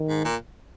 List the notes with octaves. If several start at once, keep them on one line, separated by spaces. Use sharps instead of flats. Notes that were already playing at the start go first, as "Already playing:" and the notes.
Already playing: D#3
G#2
A#2